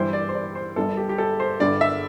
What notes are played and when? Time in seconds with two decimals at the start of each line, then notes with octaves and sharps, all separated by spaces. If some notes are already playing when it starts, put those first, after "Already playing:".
Already playing: G2 E3 G3 E4 C5
0.13 D5
0.29 C5
0.35 D5
0.55 C5
0.76 G1 G2 G3 A4
0.97 G4
1.09 G4
1.18 A4
1.40 C5
1.60 G1 G2 D3 D5
1.81 E5